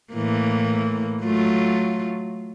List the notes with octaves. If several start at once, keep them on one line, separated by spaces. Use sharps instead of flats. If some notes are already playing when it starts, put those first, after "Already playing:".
A2 E3 A#3
F#3 A3 F4